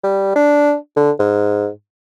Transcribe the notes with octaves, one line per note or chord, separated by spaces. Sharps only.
G3
D4
D3
G#2